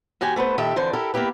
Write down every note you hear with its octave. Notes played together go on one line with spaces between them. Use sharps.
D#2 F#4 G4 G#5
A3 B3 B4 C5
A#2 D#3 G4 A4 E5
F2 D3 E3 C5 D5
E4 G4 A4 A#4
A#3 B3 E4 G4 B4